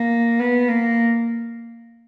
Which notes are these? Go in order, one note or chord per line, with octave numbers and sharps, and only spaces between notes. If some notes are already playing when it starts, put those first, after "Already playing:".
Already playing: A#3
B3
A#3